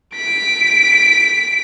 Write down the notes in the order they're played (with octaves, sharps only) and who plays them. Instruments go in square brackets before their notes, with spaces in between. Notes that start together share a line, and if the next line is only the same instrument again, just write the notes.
[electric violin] B6 D7